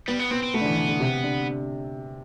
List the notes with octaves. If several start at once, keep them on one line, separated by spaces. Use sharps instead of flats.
G3 B3
B3
B3 C4
C4
A3 B3
D3
E3
D3
D3
C3
D3